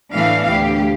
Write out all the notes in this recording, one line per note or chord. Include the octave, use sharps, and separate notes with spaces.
A2 E3 B3 D4 F5
D2 G4